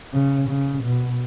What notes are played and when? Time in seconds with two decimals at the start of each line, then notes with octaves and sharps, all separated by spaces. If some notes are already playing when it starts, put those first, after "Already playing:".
0.13 C#3
0.49 C#3
0.84 B2